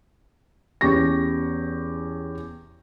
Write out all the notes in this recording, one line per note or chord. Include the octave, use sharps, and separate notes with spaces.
E2 C#4 G4 C#6 A#6